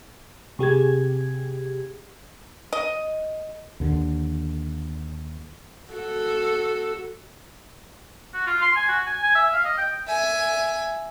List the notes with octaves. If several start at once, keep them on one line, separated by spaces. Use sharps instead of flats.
C3 G4 G#4 G#6
D#5
D#2 D3
F#4 A4
F#4
F4
C6
G#5
F#4
G#5
G#5
E5
F5
D#5
G5
E5 G#5